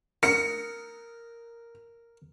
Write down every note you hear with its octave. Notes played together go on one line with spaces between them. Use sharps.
A#4 C#7